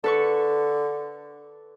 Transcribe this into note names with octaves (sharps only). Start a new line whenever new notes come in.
D3 A4 B4 C#6